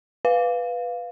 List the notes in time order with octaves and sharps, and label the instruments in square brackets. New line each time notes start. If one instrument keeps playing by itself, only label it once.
[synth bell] B4 F5